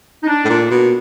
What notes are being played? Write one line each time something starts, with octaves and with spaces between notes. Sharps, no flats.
D#4
D4
A2
A#2
B2